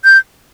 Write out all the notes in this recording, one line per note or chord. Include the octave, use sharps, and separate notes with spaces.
G6